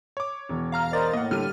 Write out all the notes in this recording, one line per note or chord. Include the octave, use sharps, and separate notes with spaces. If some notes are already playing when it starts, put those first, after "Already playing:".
C#5 D6
E1
F5 A#5 F6
A#4 C5 D5 D#5 A6
A2 A#3 D#5 F#5
D3 G3 F6 D#7